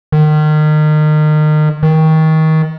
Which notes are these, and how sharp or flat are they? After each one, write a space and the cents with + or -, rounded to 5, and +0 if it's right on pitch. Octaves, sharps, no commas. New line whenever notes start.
D#3 -30
D#3 +25